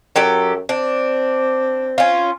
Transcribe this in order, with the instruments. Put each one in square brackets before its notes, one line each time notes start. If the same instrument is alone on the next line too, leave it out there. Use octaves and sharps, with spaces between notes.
[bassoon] F#2 [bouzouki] F#3 G4 A4
[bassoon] C4 [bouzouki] D4
[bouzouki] C#4 F4